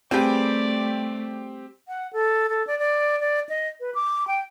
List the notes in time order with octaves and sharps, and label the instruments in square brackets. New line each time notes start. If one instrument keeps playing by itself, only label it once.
[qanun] G3 G#4 B4 [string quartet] A3 [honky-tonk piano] C4 G4 [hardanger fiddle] D5
[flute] F#5
A4
A4
D5
D5
D5
D#5
B4
D6
G5